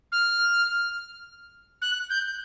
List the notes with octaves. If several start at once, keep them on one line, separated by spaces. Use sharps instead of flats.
F6
F#6
G6